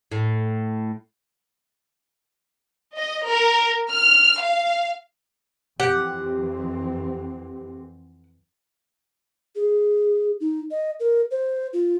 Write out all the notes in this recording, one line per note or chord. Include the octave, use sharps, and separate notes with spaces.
A2
D#5
A#4
F6
F5
F2 E3 C4 G4 F#5
G#4
D#4
D#5
A#4
C5
F4